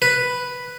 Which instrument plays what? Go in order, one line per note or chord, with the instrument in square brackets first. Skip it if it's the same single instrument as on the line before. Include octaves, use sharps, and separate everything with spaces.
[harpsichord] B4